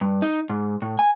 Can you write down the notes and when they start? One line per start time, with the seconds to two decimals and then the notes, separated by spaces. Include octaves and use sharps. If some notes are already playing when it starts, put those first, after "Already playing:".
0.01 G2
0.22 D#4
0.50 G#2
0.82 A2
0.99 G#5